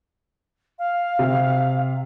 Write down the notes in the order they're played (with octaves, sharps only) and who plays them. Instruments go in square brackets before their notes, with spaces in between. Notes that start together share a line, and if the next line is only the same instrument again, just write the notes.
[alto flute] F5
[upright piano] C3